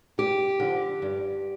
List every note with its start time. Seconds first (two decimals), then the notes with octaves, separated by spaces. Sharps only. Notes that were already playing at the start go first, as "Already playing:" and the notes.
0.18 G2 G4
0.60 D3 F3
1.02 G2